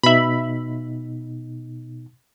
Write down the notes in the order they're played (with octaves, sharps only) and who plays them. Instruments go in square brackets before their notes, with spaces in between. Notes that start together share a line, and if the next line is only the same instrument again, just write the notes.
[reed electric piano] B2 D#4 [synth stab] E5 B5